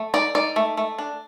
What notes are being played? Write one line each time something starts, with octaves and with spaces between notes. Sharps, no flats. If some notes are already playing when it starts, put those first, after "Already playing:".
Already playing: A3
D#4 D5
D#4 D5
A3
A3
D4